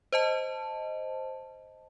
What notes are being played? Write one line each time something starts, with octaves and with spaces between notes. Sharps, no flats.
C5 D#5 A5